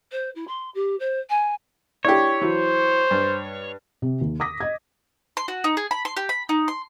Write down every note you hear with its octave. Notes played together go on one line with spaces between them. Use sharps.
C5
E4
C6
G4
C5
G#5
D4 E4 G4 C#5
E3 F#3 C5
G2
C3
D#2
D6 D#6 A#6 B6
D#5 G#6
C6
F#4
D#4
G#4
B5
C6
G4
B5
D#4
C6